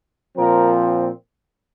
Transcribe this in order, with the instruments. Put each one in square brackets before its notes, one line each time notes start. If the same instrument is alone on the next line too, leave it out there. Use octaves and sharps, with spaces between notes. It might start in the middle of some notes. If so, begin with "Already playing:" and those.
[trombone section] A#2 F3 C4 A#4